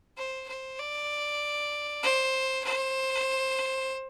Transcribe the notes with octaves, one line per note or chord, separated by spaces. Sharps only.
C5
C5
D5
C5
C5